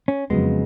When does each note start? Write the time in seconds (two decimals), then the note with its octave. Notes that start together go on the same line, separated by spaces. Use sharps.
0.08 C#4
0.30 F2 C#3 F#3 G#3 B3